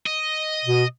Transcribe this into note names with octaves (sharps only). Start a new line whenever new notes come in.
D#5
B2